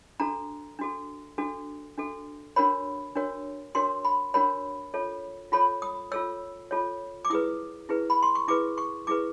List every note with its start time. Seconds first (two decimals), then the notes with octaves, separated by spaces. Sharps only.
0.20 D4 F#4 A4 A#5
0.79 D4 F#4 A4
1.38 D4 F#4 A4
1.97 D4 F#4 A4
2.56 D4 F#4 A#4 C#5 B5
3.16 D4 F#4 A#4 C#5
3.75 D4 F#4 A#4 C#5 C6
4.05 B5
4.34 D4 F#4 A#4 C#5 B5
4.94 F4 A4 C#5
5.52 F4 A4 C#5 B5
5.82 D#6
6.12 F4 A4 C#5 E6
6.71 F4 A4 C#5
7.25 D6
7.30 E4 G#4 B4 D#6
7.89 E4 G#4 B4
8.10 B5
8.23 C6
8.35 C#6
8.48 E4 G#4 B4 D6
8.78 C#6
9.07 E4 G#4 B4 D6